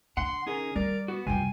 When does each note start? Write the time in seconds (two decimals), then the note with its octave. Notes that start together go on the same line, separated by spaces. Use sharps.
0.17 D3 F#5 C6
0.46 C#4 D#4 G#4 A#4
0.76 G3 A#4 D5
1.08 B3 F#4
1.27 F#2 C3 G3 F4 G5 G#5